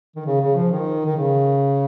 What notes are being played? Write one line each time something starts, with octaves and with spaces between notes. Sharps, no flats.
D#3
C#3
C#3
F3
D#3
D#3
C#3